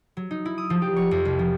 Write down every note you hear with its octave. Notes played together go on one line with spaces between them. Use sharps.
F#3
D#4
E4
D#6
F3
G4
C#6
F2
C2
F3